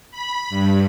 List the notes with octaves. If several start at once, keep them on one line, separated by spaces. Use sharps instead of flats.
B5
G2